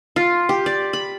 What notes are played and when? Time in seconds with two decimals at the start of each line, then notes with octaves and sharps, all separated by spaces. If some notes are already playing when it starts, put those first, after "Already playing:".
0.16 F4
0.49 G4
0.66 D5
0.93 B5